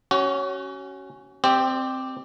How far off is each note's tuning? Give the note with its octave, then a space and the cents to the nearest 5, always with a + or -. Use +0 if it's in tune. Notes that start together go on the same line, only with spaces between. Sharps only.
C#4 +0 F#4 +35
C4 +0 G4 +0 D5 +45